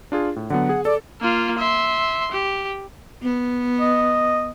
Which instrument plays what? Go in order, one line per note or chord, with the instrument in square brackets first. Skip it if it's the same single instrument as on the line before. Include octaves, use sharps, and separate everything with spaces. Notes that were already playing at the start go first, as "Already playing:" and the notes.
[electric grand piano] D4 F4 G#4
A2
[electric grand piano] D3 F#3 B3 [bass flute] F#5
[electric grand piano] G#4
[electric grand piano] A4 [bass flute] D5
[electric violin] A#3 F4
E5 C6
G4
[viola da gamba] B3
[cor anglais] D#5